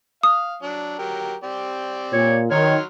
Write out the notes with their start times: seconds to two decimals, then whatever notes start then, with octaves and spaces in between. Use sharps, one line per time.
0.23 F5 D#6
0.62 F#3 D4
0.99 F#3 G4 A#4
1.43 C4 G4 D5
2.13 A#2 C#5
2.51 D#3 F#3 C#5 C6 F6